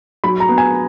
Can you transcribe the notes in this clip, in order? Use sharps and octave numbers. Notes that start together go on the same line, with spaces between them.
F#3 B5
A#5
B3
G#5